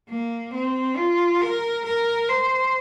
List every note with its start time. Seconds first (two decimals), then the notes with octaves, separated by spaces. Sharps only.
0.10 A#3
0.54 C4
0.97 F4
1.42 A#4
1.85 A#4
2.29 C5